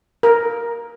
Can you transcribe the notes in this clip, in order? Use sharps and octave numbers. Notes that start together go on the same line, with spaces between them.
A#4